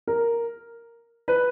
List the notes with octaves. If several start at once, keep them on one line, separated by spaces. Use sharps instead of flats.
A#4
B4